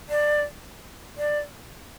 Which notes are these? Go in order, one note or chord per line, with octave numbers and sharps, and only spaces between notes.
D5
D5